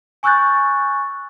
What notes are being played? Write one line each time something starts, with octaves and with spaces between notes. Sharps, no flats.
G#5 C#6 E6 F#6 G6 A6